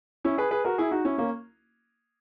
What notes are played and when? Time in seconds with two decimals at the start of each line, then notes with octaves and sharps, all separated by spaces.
0.24 C#4 E4
0.38 G#4 B4
0.51 G#4 B4
0.65 F#4 A#4
0.78 E4 G#4
0.91 D#4 F#4
1.05 C#4 E4
1.18 A#3 C#4